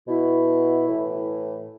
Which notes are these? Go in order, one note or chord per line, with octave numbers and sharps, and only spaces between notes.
B2 E4
A2 E3